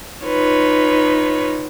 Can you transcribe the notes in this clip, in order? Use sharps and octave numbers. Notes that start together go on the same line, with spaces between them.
D#4 F4 B4 C#5